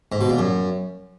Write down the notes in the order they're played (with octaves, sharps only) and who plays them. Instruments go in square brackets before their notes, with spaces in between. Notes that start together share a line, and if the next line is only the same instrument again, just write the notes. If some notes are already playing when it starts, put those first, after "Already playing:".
[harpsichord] G#2
B2
A#2
F#2